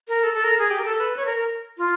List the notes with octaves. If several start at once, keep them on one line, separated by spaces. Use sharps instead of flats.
A#4
A4
A4
A#4
G#4
G4
A#4
A4
B4
C#5
A#4
A#4
F4